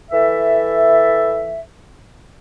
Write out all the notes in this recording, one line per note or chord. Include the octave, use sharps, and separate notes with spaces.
E3 A4 E5